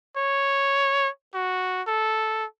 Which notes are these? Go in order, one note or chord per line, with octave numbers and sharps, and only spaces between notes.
C#5
F#4
A4